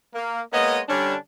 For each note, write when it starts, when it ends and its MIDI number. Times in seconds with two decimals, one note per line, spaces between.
0.14 0.40 58
0.53 0.80 56
0.53 0.80 58
0.53 0.80 59
0.53 0.80 73
0.53 0.80 75
0.88 1.15 50
0.88 1.15 55
0.88 1.15 61
0.88 1.15 62